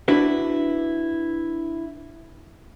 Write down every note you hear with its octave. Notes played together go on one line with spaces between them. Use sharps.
D4 E4 F#4 B4